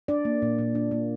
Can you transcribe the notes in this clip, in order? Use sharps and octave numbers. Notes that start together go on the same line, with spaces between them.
D4 D5
A#3
A#2
A#2
D4
A#3